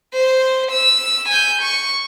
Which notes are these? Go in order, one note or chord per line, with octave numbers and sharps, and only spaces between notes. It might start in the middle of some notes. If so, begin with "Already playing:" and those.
C5
E6
G#5 G6
C#6